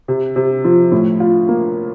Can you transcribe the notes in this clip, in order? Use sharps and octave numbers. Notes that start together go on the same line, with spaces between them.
C3
C3
F3
A2
F4
A#3